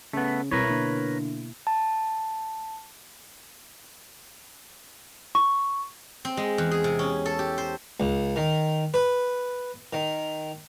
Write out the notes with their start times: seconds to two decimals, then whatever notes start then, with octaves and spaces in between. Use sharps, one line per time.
0.13 C#3 A3 B3
0.51 C2 B2 E4 A#4 B4 C#5
0.70 D3 A#3
1.67 A5
5.35 C#6
6.25 C4
6.37 G#3
6.58 E2
6.71 G#4
6.84 C3
6.99 C#4
7.26 A4
7.39 G4
7.58 C5
8.00 C#2
8.36 D#3
8.94 B4
9.93 D#3